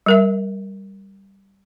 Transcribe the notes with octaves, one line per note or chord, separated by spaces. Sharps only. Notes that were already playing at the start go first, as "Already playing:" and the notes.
G3 A#4 E5